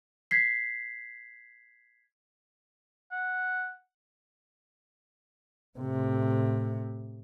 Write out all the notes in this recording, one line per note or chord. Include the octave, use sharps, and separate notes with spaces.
G#6 B6 C7
F#5
A2 C3